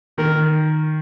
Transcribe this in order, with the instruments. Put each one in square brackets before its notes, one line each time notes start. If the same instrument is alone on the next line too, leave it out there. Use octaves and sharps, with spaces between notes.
[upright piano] D#3 [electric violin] A#4